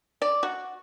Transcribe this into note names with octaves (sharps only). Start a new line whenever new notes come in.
D5
F#4